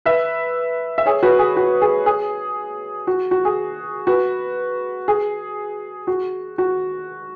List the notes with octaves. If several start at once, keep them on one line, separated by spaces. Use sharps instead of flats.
B4 E5
E5
G#4 C#5
F#4 B4
G#4
F#4
G#4
G#4
F#4
F#4
G#4
F#4 B4
G#4
F#4
F#4